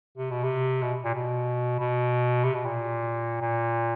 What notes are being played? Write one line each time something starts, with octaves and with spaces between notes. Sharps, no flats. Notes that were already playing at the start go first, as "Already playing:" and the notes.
C3
B2
C3
B2
A#2
B2
B2
C3
B2
A#2
A#2